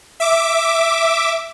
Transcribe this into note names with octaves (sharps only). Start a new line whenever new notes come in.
E5 D6